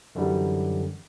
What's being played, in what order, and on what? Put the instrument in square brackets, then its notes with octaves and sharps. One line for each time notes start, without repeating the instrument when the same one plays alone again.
[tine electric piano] F#2 D3 E3 G3